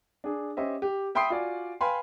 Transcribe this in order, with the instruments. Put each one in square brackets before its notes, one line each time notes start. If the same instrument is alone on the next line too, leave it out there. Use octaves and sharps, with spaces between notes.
[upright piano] D4 G#4
C#4 G4 C5 D#5 E5
G4
E5 G5 B5 C6 D#6 C7
F4 F#4 D5 G#5
B4 F5 G5 G#5 B5 C6